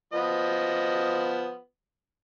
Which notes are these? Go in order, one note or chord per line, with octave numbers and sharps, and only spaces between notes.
F3 B3 D#5